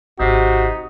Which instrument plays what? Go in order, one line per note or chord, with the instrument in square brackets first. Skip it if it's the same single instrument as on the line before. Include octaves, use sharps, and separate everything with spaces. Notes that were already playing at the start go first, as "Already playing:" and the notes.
[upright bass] G#1 [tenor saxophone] C3 [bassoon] D#4 [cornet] F#4